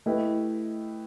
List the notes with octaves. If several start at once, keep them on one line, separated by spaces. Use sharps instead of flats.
A3 E4 G4 B4 D#5